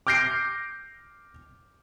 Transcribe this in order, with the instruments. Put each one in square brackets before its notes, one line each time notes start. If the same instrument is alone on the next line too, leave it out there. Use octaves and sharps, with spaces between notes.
[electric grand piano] D6 F6 G6 A#6 C7 D7